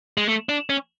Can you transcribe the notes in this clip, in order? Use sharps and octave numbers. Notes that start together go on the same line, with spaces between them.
G#3
A3
D4
C#4